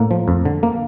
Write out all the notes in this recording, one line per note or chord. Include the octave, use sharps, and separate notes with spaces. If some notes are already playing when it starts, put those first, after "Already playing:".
Already playing: A2 A#3
F3
F2
D3
A#3